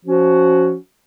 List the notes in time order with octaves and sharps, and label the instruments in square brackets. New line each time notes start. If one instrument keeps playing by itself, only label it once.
[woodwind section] F3 C#4 F#4